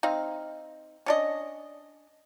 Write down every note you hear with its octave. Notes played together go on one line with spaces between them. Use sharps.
C4 D#4 F5
C#4 D4 D#5